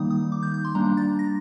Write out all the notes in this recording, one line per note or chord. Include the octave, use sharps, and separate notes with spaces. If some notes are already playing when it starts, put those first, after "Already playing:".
Already playing: D#3 G3 A#3 D#4 D#6
D#6
D6
G6
G6
C6
G3 A#3 D4 A#5
A6
A#6